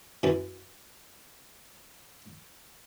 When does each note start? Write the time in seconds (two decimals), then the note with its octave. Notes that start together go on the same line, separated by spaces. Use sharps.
0.23 F#2 E3